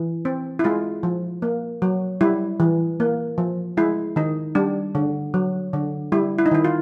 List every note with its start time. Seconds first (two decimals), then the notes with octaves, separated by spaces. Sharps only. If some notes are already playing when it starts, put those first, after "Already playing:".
Already playing: E3
0.25 C4
0.59 E4
0.64 G#3 F4
1.03 F3
1.42 A#3
1.82 F#3
2.21 G3 E4
2.60 E3
3.00 A#3
3.38 F3
3.77 G#3 E4
4.16 D#3 D#4
4.55 G3 D4
4.95 D3
5.34 F#3
5.73 D3
6.12 G3 E4
6.38 E4
6.46 D#4
6.51 D#3 E4
6.65 F4